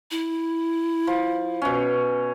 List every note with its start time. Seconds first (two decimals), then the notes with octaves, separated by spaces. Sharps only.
0.11 E4
1.07 F3
1.62 B2 C#4